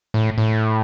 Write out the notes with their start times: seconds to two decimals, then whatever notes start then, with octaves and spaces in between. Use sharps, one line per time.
0.14 A2
0.38 A2